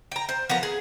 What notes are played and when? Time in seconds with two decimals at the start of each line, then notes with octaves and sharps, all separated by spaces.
0.12 G5 A#5
0.29 C5
0.49 F3 B3 A#4 A#5
0.63 G#4